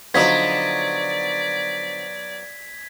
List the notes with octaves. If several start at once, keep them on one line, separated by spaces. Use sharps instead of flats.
D3 F3 F#3 B3 D#4 D5 G#6 B6